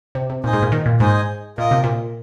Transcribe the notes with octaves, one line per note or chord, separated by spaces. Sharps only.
C3
C3
A#2 D#4 C5 D#5 G#5
G#2
A#2
D#3
A#2
G#2 D#4 C5 D#5 G#5
A#2 F4 A#4 D#5
C3
A#2